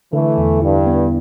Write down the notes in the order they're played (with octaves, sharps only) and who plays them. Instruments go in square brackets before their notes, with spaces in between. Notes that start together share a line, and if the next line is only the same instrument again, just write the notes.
[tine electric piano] D3 [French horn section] E3 A3
[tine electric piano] E2
[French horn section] G2 [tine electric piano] E4
[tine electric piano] B3